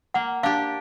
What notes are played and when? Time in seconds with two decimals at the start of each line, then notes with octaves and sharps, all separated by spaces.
0.14 A#3 F#5
0.43 D4 G4 F5